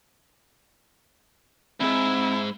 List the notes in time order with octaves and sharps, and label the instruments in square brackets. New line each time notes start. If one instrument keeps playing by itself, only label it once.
[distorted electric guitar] D2 G#2 [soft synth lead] C4 [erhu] E4